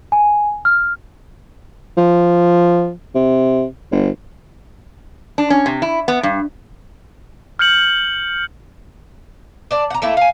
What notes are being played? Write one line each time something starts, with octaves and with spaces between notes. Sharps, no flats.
G#5
F6
F3
C3
G1
D4
C#4
C3
E4
B3
G2
F6 G6 C#7 F#7
D4 D5
F#5 A#5
A3 A#3 E4 A4
F5 G#5